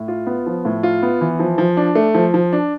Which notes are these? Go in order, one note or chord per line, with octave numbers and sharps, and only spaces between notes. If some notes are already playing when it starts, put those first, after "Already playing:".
Already playing: A2
F4
B3
F3
A2
F4
B3
E3
F3
F3
D4
A3
F3
F3
D4